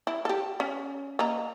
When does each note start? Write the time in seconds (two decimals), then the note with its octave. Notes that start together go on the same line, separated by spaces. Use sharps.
0.07 E4
0.25 G4 A4
0.60 C#4
1.19 A#3 D#5 A#5